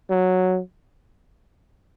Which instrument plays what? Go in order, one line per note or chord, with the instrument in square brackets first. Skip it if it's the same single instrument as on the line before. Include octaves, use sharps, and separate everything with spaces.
[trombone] F#3